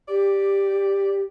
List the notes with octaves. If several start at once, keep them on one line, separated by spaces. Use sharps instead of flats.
G4 D5